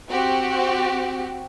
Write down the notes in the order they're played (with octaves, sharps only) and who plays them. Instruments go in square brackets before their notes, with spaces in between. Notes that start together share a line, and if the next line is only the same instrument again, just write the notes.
[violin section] C4 F#4 G4